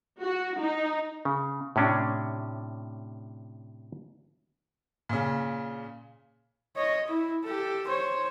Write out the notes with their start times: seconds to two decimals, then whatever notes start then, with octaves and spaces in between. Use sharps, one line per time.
0.20 F#4
0.59 D#4
1.25 C#3
1.76 A2 C3 C#4 D4
5.09 A#2 C#3
6.76 C#5 D#5
7.08 E4
7.44 G4 A4
7.87 C5 C#5